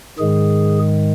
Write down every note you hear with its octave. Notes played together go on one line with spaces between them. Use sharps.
G#2 D#3 G#3 G#4